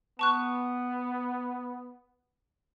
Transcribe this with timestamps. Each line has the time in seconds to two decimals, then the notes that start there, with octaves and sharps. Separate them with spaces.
0.19 B3 A5 C#6 F#6